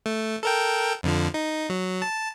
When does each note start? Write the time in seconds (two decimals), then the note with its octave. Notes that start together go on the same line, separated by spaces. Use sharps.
0.06 A3
0.43 A4 A#4 G5
1.03 F2 D3 F3
1.34 D#4
1.70 F#3
2.02 A5